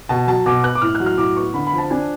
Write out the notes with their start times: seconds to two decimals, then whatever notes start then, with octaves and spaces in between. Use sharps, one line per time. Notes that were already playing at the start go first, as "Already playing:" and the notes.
0.09 B2 A5
0.27 F#3 A5
0.46 B2 D6
0.63 B3 F#6
0.75 D6
0.82 A2 F6
0.95 F#6
1.00 F#3
1.06 F6
1.18 A2 D6
1.37 B3 C#6
1.54 D3 B5
1.67 B5
1.73 F3
1.78 A5
1.90 D4 G#5